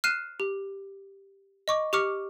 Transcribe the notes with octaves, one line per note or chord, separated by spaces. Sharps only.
F6 F#6 C7 D#7 E7
G4
D#5 C#6 D6
G4 C#6 D6 F6 C#7